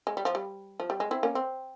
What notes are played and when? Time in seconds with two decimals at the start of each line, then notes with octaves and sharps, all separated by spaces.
0.07 G#3
0.17 G3
0.25 F3
0.35 G3
0.80 F3
0.90 G3
1.00 G#3
1.11 C4 E4
1.23 A#3 C#4
1.35 C4